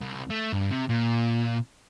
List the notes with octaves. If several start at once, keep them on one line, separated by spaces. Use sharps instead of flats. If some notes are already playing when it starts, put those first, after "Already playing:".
C2
A3
G2
C3
A#2